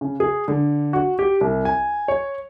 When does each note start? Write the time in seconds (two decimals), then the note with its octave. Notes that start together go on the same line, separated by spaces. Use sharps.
0.01 C#3
0.20 G#4
0.48 D3
0.93 F#4
1.19 G4
1.41 C2
1.65 G#5
2.08 C#5